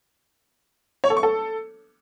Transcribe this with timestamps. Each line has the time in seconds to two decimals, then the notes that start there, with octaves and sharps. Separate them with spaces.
1.04 C#5
1.10 A4
1.17 C#6
1.23 A4